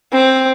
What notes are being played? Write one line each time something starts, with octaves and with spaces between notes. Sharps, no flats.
C4